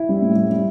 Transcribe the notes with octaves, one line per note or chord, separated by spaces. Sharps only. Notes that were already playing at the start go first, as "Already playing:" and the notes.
Already playing: E4
G3
A2
G3
G3